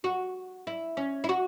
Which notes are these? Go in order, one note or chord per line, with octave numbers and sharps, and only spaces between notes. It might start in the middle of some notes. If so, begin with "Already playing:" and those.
F#4
E4
C#4
E4
F#4